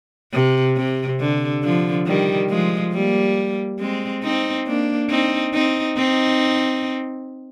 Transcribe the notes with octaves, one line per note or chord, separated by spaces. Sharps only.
C3
C3
D3
D3 F3
D#3 G3
F3 G#3
G3 A#3
G#3 C4
C4 D#4
A#3 D4
C4 D#4
C4 D#4
C4 D#4